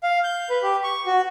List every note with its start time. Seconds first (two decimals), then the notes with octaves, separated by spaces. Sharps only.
0.03 F5
0.24 G6
0.50 B4
0.63 G4
0.84 C#6
1.06 F#4